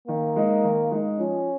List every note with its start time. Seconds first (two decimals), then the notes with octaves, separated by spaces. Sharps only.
0.08 D#3 A#3
0.36 G#3 D#4
0.64 D#3
0.91 G#3 D#4
1.19 F3 C#4